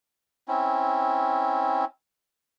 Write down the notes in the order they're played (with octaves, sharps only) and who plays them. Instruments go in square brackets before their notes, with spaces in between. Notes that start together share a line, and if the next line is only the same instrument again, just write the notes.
[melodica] C4 C#4 E4